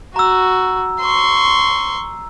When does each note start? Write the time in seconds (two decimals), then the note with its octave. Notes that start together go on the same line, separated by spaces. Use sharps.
0.16 F#4 A#5 E6
1.01 C6 C#6